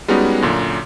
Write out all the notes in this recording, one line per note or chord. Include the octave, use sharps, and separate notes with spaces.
G3 G#3 B3 C#4 D#4 F#4
F#2 A#2 D3